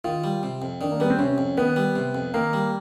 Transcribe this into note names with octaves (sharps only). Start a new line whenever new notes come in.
D#3 F4
G3
C3
F2
D#3 D4
A#3
G3 B3
C4
C3 C#4
F2
D#3 B3
G3
C3
F2
D#3 A#3
G3